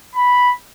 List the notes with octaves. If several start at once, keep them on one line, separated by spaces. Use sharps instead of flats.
B5